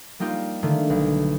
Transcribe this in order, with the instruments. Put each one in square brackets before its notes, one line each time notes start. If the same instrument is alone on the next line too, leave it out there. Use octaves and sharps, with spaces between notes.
[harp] G3 A#3 D#4 F4 G4
D3 D#3 A3 A#3
B1